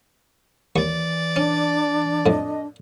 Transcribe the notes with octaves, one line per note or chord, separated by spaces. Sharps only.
D#2 E3 D5 C#6
C#4 D4
F2 A2 D#5